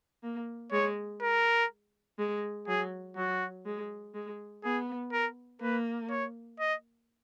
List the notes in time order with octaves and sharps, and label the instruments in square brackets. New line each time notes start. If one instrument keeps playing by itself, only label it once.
[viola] A#3
[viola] G#3 [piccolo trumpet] C#5
[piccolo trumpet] A#4
[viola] G#3
[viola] F#3 [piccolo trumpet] G#4
[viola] F#3 [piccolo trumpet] F#4
[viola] G#3
G#3
[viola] B3 [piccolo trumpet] G#4
[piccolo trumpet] A#4
[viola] A#3 [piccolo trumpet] B4
[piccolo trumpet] C#5
D#5